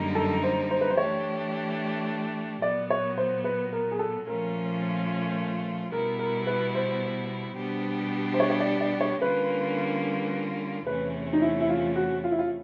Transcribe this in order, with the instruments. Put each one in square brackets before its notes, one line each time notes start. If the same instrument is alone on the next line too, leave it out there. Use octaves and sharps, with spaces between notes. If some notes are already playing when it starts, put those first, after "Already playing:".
Already playing: [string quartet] F#2 D3 G3 A#3 D#4
[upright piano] A4
C5
C5
B4
C5
[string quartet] E3 A3 D4 G4 [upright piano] C#5
[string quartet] A#2 F#3 B3 [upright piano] D5
[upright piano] C#5
C5
B4
A#4
G#4
A4
[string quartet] A#2 F3 A3 C#4 F4 [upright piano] A#4
[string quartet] B2 G3 B3 E4 [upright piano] A#4
[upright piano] A#4
B4
C5
[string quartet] B2 G3 B3 D4 G4
[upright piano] C5
C#5
C#5
D5
D5
C#5
[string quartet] D3 G3 A#3 C#4 F4 [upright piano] B4
[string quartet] E2 C3 E3 A3 C#4 [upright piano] B4
[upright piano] D#4
E4
E4
F4
F#4
F4
E4
F4